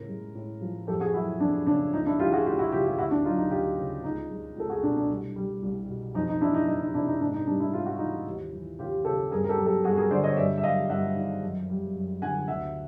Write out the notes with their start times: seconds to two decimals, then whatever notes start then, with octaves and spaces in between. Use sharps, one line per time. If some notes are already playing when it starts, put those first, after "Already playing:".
Already playing: A2 C#3 A#4
0.08 G#3
0.35 A2
0.61 F3
0.87 F2 G4 A4
1.00 F#4 G#4
1.14 F#3 E4 F#4
1.40 F2 D4
1.66 C#3 D4
1.93 C#2 D#4
2.06 D4 E4
2.19 E3 F4 G4
2.33 F#4 G#4
2.45 C#2 F4 G4
2.59 E4 F#4
2.72 C#3 F4 G4
2.85 F4 G4
2.98 D2 E4 F#4
3.11 D4
3.25 F#3 D#4 F4
3.38 D#4
3.51 D2 F4 G4
3.78 C#3
4.04 C#2 D#4
4.30 G#3
4.57 C#2 A4
4.69 F#4 G#4
4.83 B2 D4
4.97 D4
5.10 C2
5.36 G3
5.62 C2
5.89 B2
6.15 F2 D#4
6.29 D#4
6.41 E3 D4 E4
6.54 D#4
6.67 F2 D#4
6.81 D#4
6.94 C3 D4 E4
7.07 D#4
7.20 G#2 D4
7.34 D#4
7.47 G3 D4
7.60 D4 E4
7.73 G#2 F4
7.86 F#4
7.98 E3 D#4 F4
8.26 D#2
8.53 E3
8.79 D#2 F4 G4
9.05 C#3 G4 A4
9.31 G2 G#4 A#4
9.44 A#4
9.49 G4 A4
9.58 F#3
9.66 G4 A4
9.84 G2 F#4 G#4
9.97 G#4 A#4
10.11 D3 C5 D5
10.24 C#5 D#5
10.37 G2 D5 E5
10.58 E5
10.63 F#3 D#5 F5
10.90 G2 E5 F#5
11.16 D#3
11.43 F#2
11.70 G3
11.95 F#2
12.22 D3 F#5 G#5
12.48 D2 E5 F#5